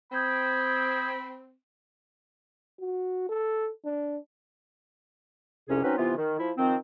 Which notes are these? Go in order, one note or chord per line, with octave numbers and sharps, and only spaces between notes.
C4 B5 D#6 G6 G#6
F#4
A4
D4
C2 F2 C3 C#4 G#4
F#3 C4 C#4 D#4 B4
C3 E3 B3 F4
D#3
F3 E4
D#3 F3 C4